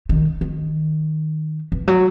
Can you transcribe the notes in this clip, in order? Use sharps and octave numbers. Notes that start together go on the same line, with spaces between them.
D#3
D#3
E3
F#3